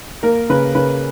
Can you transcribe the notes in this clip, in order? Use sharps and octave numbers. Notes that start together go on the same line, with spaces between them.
A#3 A#4
C#3 B4
C#3 B4